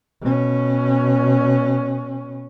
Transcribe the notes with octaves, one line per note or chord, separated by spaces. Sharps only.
B2 C#4